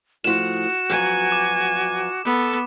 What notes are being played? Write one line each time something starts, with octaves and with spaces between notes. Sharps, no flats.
A2 F3 F#4 E7
F2 F#3 B4 G#5
D6
B3 A4